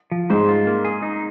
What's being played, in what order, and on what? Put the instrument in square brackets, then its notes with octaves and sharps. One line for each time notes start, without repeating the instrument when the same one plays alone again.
[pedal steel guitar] F3
[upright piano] G#2 [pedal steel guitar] C5
[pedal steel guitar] F4
A#3
G#4
D#4